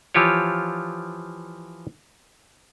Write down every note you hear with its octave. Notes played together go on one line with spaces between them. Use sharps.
E3 F3 F4 G4 C#5